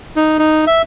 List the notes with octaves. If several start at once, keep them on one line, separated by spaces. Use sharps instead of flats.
D#4
D#4
E5